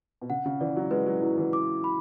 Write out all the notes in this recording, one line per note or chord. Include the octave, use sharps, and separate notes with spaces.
B2
C#3 F#5
C#3
E3 D5
F#3
G#3 B4
F#3
F#3 E4
E3
D6
B5